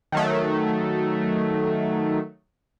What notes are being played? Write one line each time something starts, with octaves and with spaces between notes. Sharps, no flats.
D#3 F#3 A3